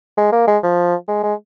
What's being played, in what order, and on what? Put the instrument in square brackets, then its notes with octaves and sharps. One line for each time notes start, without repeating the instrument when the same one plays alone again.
[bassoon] G#3
A#3
G#3
F3
G#3
G#3